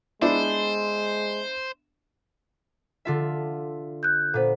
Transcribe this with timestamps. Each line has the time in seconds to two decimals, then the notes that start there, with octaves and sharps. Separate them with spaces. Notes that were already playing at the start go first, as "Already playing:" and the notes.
0.22 G#3 B3 D4 E4 C5
3.05 D3 F4 E5
4.03 F#6 G6
4.34 A#2 B3 A4 C5